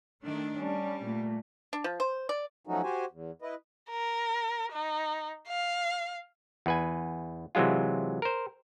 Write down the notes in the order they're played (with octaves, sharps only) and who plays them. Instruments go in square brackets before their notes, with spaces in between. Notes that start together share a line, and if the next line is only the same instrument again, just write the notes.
[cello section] D#3 A3 D4
[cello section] G3 [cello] C#4 D4
[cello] A#2 A3
[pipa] D4
F3
C5
D5
[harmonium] F3 F#3 A3 C#4 D#4 F#4
F#4 G4 C5 G#5
E2
E4 B4 D#5
[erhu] A#4
D#4
F5
[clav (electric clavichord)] E2 B4 G#5
C3 E3 F#3 G#3 F4
A#4 C5